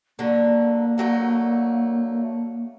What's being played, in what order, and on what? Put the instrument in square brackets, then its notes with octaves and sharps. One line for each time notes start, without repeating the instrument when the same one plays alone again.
[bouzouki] D3 F#3 [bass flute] A#3
[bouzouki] D3 F#3 A3